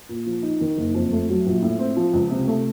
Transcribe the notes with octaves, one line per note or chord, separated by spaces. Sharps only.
A#2
F3
D#4
D#3
F#1
F2
A3
F#3
A#1
A2
C4
F3
C#2
C3
A3